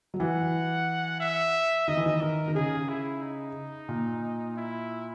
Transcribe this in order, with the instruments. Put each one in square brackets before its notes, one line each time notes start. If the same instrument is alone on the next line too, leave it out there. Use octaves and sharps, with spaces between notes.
[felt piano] F#3
[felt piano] E3 [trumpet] F#5
[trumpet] E5
[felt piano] D#3 [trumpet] D#5
[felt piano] E3
D#3
[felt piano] D#3 [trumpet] A#4
[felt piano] D#3
[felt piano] C#3 [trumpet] G#4
[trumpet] E4
D#4
[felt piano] A#2
[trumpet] E4